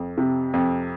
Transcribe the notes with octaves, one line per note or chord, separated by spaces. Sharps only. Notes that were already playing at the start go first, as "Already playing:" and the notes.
Already playing: F2
C3
F2